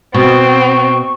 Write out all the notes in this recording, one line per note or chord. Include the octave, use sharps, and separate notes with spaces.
B2 C4 C#6